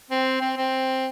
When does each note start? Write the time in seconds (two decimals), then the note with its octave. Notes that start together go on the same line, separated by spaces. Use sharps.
0.11 C4
0.41 C4
0.57 C4